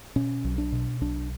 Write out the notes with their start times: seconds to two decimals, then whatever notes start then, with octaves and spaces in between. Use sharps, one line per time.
0.16 B2 C#4
0.44 B1
0.58 D4
0.72 B2
1.01 B1 D4